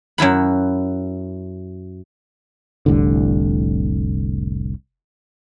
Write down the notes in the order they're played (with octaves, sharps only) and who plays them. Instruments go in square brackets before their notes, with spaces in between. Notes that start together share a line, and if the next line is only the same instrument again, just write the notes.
[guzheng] F#2 F#3 E4 B5
[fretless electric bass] F1 C2 A2 D3